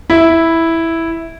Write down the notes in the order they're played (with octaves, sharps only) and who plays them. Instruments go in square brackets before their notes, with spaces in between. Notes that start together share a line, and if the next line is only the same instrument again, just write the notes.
[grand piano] E4